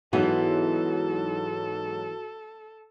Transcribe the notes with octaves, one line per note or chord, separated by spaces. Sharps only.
G#2 E3 F#3 B3 D#4 F#4 A4